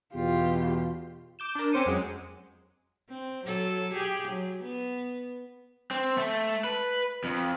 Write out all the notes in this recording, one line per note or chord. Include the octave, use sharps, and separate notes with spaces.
E2 B2 F4 G4
D6 G6 E7
D4 A#4
C4 C#4 C5 D6 C#7 D#7
F2 F#3 G#3
C4
F#3 A4
G4 G#4
F#3
B3
C4
A3
B4
F2